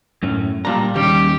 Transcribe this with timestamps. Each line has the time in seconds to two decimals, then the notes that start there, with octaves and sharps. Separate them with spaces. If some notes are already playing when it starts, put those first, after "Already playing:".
0.23 F#2 A2 C#4
0.65 A#2 G3 D4 A#5
0.96 D#2 D#3 G3 C#4 G4